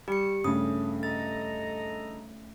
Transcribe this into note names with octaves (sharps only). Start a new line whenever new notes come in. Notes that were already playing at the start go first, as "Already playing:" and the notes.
G3 G4 C#7
G2 C#3 A3 C#4 D#6
A4 D#5 A#5 A6